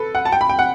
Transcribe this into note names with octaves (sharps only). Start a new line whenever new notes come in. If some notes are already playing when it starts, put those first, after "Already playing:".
Already playing: A4 B4
F#5
A5
G5
B5
G5
F#5